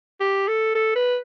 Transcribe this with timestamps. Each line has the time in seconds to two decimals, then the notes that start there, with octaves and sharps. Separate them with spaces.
0.20 G4
0.48 A4
0.75 A4
0.95 B4